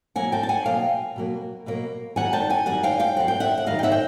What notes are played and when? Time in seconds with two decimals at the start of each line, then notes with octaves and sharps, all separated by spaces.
0.16 B2 F#3 A#3 F#5 G#5
0.32 G5 A5
0.43 A5
0.49 F#5 G#5
0.66 B2 F#3 A#3 F5 G5
1.16 B2 F#3 A#3
1.66 B2 F#3 A#3
2.16 F#2 D#3 G3 F#5 G#5
2.33 G5 A5
2.50 F#5 G#5
2.66 F#2 D#3 G3 F#5 G#5
2.83 F5 G5
3.00 F5 G5
3.16 F#2 D#3 G3 F#5
3.28 G5
3.40 E5 F#5
3.58 F#5
3.66 F#2 D#3 G3 D#5 F5
3.79 G5
3.83 E5 F#5
3.92 G5